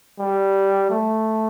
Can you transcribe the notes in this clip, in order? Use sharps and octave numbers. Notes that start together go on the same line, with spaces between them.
G3
A3